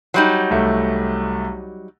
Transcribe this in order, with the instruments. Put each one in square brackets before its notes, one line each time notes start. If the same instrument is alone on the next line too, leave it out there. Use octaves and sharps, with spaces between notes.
[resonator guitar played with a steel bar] F#3 G3 D#4
[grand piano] C2 A3